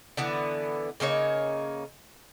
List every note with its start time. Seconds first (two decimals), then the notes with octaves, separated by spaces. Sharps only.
0.17 D3 E3 B3
1.00 C#3 A#3 D#4 C#5